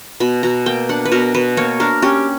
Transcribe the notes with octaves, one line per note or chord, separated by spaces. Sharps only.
B2 B5
B2 A#5
A#3 G5
D4 F#5
B4
B2 A#4
B2 B4
A#3 C#5
D4 A#4
C#4 G4